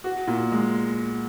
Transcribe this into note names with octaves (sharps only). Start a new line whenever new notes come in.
F#4
A#2
G#3